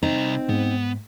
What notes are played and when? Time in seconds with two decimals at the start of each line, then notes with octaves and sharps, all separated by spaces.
0.03 C2 C4 D#4 A#5
0.49 G#2 B3